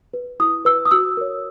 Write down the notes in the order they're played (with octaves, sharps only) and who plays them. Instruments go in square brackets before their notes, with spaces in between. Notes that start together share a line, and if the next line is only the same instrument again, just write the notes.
[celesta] B4
E4 D#6
B4 E6
D#6
F#4 E6
A#4 C#5